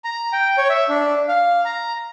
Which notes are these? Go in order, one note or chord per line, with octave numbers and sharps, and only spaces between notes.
A#5
G5
C#5
E5
D4
F5
A#5